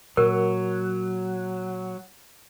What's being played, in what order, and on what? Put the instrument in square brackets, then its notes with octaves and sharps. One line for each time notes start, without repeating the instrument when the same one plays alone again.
[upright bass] A#2 [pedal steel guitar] F#3 [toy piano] A#4